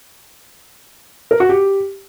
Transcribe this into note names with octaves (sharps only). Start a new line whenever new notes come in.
A#4
F#4
G4